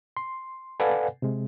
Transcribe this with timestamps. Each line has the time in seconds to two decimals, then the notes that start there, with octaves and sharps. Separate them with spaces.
0.17 C6
0.80 A4 B4 D5 F5 F#5 G#5
1.22 C3 G#3